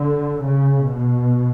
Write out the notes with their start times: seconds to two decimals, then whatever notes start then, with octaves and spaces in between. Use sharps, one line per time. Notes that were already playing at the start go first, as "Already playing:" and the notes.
Already playing: D3
0.44 C#3
0.91 B2